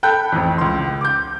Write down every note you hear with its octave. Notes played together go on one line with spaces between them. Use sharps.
A4 G5 B5 F#6 G6
A1 F2
C#2 C6
D6 G6